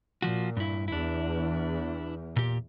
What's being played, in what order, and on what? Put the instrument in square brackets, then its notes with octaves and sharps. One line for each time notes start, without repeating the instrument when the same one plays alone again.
[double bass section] A#2 [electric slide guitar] F3 F#4
[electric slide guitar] G2 E4
[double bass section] E2 [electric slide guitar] D4 E4
[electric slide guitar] A#2 G4